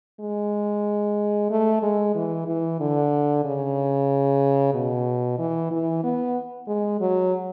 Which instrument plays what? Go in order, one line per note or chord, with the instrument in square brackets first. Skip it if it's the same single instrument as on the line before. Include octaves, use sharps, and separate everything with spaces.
[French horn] G#3
A3
G#3
E3
E3
D3
C#3
B2
E3
E3
B3
G#3
F#3